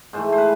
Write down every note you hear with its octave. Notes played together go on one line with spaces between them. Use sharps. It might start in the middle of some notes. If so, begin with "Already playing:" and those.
G#2 E3 A3 C5
C5
B4